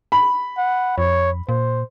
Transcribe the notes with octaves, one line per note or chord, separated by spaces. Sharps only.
B5
F#5
F2 C#5
A#2 C5